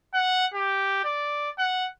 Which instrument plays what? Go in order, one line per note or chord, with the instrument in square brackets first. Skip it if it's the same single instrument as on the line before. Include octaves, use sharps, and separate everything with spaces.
[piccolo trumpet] F#5
G4
D5
F#5